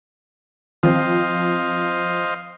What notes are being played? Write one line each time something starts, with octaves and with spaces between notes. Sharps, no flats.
F3 C4 C5 D#5 F5